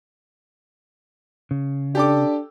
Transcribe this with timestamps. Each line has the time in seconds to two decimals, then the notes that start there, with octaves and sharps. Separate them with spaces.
1.51 C#3
1.95 D4 G4 A4 D6